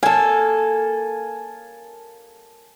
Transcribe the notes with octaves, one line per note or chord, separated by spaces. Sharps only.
A#3 A4 G#5 A5